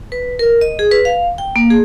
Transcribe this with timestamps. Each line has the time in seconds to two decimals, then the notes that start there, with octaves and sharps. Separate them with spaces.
0.12 B4
0.39 A#4
0.61 D#5
0.79 G#4
0.91 B4
1.05 F5
1.38 G5
1.56 A#3
1.70 G#4